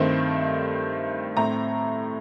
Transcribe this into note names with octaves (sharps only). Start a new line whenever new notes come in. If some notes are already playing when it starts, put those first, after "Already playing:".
Already playing: G2 D#3 A3 C4 C5
A2 A3 C4 A#5